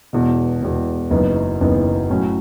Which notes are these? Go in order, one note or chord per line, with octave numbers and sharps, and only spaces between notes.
E1 E2 B2
E1 E2 B2
F#1 F#2 E3 B3 D#4
F#1 F#2 E3 B3 D#4
A2 F#3 C#4